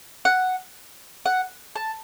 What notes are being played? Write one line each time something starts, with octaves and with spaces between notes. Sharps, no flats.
F#5
F#5
A5